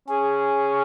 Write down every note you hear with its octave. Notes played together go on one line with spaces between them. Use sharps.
C#4 G#4